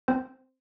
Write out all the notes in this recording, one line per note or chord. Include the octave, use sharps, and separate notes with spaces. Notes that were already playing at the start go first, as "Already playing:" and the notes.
C4 C5